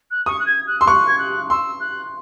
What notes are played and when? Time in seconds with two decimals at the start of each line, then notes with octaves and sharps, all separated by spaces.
0.11 F#6
0.26 C#6 D#6
0.40 F#6
0.46 G#6
0.67 F#6
0.79 C6 E6
0.87 C#6 F#6
1.07 G#6
1.19 F#6
1.50 C6 E6
1.80 F#6